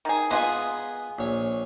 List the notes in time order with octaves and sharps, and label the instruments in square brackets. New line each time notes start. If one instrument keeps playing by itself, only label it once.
[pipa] D#3 G#4
[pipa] G#3 F4 G#4 [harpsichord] B3
[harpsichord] A#1 C#5